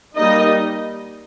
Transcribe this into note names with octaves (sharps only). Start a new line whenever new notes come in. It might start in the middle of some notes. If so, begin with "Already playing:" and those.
G3 A#3 D#4 D#5